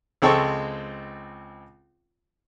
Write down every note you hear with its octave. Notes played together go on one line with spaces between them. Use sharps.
C#2 G#3 C4 A4 C5 C#6